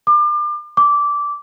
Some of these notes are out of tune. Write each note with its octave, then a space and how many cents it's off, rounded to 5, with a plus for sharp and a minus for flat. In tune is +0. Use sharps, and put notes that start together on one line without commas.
D6 +35
D6 -15